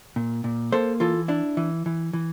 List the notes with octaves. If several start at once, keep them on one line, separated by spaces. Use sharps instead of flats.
A#2
A#2
A#3 A4 C5
E3 F4 A4
D4 E4
E3
E3
E3